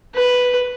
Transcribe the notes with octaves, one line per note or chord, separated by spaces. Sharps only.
B4